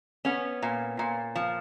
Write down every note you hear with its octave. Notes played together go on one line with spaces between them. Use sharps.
B3 C#4
A#2
A#2
F3